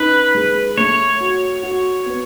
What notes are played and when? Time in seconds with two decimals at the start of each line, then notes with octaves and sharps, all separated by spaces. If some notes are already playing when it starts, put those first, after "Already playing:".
Already playing: C#4 D#4 B4
0.35 G#3
0.77 A3 C#5
1.20 F#4
1.63 F#4
2.06 B3